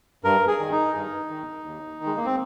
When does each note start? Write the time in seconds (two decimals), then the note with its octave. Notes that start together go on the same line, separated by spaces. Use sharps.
0.24 G2 A#4
0.48 G#4
0.59 D#3
0.72 D#4
0.95 G2
1.30 D#3
1.66 D#2
2.00 D#3
2.06 G#3
2.16 A#3
2.26 C4